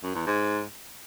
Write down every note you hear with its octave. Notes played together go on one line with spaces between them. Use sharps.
F#2
E2
G#2